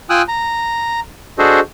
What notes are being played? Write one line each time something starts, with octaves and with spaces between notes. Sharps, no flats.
F4 G5 G#5 D#6 E6 F#6
A#5
D4 F#4 G#4 A4 C5 D#5